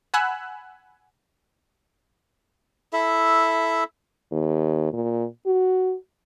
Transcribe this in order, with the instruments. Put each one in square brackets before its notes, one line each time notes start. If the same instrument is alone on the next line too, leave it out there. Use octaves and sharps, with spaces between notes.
[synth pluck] F#5 G#5 B5 E6 F#6
[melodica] E4 A4 E5
[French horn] D#2
A#2
F#4